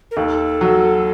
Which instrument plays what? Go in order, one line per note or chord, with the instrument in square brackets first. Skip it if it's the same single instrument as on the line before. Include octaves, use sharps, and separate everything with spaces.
[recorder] A#4
[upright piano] D#2 [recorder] A4
[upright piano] F#3